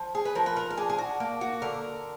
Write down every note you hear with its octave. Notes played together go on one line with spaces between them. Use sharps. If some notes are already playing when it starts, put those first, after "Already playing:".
Already playing: F3
G#4
B4
F3 A#4
B4
A#4
A#4
D4 G#4
G#4
F#4
A#3
F#4
D3 A#4